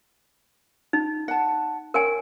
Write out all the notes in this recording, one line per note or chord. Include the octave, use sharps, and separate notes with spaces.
D#4
F#5 A5
A#4 C#5 G5 G#5